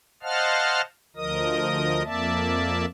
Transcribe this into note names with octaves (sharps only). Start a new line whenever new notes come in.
C5 D#5 F5 F#5 A5 F6
D2 F3 A#4 D#5 D#6
F2 A#3 D5 E5 A5